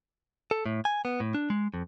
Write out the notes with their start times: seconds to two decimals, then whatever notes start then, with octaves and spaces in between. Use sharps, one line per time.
0.51 A4
0.66 A2
0.85 G#5
1.05 B3
1.20 A2
1.34 D4
1.50 G#3
1.74 F2